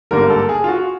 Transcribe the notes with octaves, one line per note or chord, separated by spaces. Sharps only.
G#1 G2 D3 G3 A#3 A#4
A4
G#4
F4
F#4